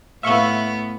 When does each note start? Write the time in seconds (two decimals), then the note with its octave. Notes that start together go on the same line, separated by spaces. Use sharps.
0.23 A2 B3 E5 F5 C#6